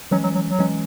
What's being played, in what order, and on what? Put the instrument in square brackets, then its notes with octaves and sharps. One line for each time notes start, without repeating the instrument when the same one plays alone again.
[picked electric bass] E3 G#3 C#4 [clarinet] F#3
[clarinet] F#3
F#3
F#3
[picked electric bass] E3 G#3 C#4